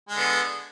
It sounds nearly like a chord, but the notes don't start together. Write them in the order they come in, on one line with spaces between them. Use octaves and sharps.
G#3 D3 B3